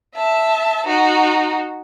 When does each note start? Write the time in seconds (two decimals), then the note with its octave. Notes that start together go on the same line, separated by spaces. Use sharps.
0.15 E5 A5
0.86 D#4 F#4